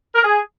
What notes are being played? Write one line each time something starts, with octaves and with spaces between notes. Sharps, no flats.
A#4
G#4